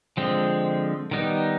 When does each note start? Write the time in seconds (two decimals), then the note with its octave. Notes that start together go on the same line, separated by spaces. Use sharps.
0.17 D3 F3 G#3 C4
1.11 D#3 G3 B3 D#4